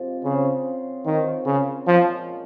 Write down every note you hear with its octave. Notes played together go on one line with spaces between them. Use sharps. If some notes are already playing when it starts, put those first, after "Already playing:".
Already playing: C3 F3 G#3
C#3 F#3 C4 F4 G#4
D#3 C4 F4 A#4 C#5
C#3
A#2 F3 G#3 C#4